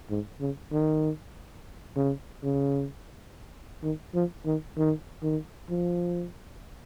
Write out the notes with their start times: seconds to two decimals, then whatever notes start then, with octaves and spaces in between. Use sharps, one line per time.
0.10 G#2
0.40 C#3
0.72 D#3
1.96 C#3
2.44 C#3
3.83 D#3
4.14 F3
4.46 D#3
4.77 D#3
5.23 D#3
5.70 F3